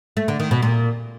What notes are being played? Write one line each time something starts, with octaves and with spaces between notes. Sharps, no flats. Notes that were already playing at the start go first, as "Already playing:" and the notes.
A3
D3
D#3
B2
A#2